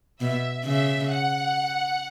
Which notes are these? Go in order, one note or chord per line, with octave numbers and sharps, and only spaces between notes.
B2 E5
C#3 E5
F#5